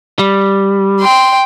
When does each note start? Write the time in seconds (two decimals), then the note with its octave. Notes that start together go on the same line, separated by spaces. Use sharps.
0.19 G3
1.01 G5 C6